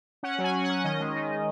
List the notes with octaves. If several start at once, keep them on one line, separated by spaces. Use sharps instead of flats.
C#4 F#5
F#3
G#5
F#3
F#5
C#4
F#5
D#3 D#5
G#3
D#3
D#3